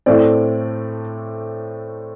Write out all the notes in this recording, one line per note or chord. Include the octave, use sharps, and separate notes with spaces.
A2 A3 C4 D5